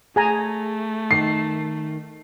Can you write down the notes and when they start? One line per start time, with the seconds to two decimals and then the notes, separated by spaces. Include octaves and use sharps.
0.16 A3 G#4 G#5 A#5
1.11 D#3 C7